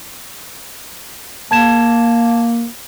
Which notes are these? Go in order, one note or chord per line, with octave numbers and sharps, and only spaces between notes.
A#3 A5 G#6 E7